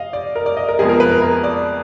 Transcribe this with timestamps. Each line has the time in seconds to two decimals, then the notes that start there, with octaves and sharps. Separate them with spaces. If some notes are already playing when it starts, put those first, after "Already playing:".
Already playing: D#5 F5
0.13 D5
0.36 A#4
0.46 D5
0.57 D#5
0.69 A#4
0.79 F2 F3 G#3 B3 G#4
0.89 A#4
1.00 B4
1.11 A#4
1.22 A#4
1.44 D5